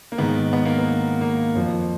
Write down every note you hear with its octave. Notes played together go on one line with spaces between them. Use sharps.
A#3
G#2 D#3 B3
B3
A#3
B3
A#3
F2 F3